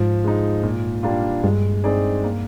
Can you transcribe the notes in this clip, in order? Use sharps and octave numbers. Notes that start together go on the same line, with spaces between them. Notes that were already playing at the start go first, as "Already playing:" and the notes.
Already playing: G#2 F3
G#3 D#4
A#2
G3 A#3 D4 F4
G2 G#3
C4 D#4 G#4 D5
A#3